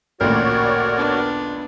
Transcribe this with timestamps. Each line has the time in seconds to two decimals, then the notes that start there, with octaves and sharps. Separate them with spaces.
0.21 A1 D2 A#2 F#4 A#4 C#5 D5
0.97 B3 D4